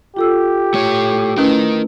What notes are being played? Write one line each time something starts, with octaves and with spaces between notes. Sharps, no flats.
F4 G4 A4 E6
A3 C#5
A3 C#4 E4 A#4 B4 D#5